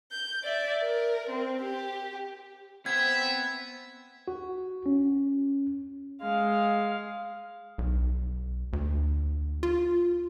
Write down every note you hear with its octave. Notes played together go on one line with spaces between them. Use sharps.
G6
D5 E5
A#4
C4
G4
B3 C4 E5 G#6
F#4
C#4
G#3 F5
B1
D2
F4